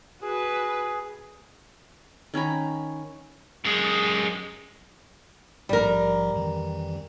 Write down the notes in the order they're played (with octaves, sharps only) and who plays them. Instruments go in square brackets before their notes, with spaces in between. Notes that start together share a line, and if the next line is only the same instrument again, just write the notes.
[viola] F#4 B4 [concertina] G#4
[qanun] D#3 C#4 A#5 B5
[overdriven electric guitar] F#2 G#3
[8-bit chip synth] A#1 G#2 F3 [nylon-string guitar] G3 A#4
[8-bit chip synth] F2 D#3 E3